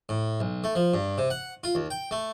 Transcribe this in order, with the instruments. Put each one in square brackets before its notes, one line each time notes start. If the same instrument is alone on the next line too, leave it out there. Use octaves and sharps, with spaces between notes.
[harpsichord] A2
B1
A3
F3
G2
C3
F#5
F4
D#2
G5
A3